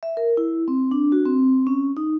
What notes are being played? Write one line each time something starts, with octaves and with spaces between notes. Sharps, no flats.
E5
A#4
E4
C4
D4
F#4
C4
C#4
D#4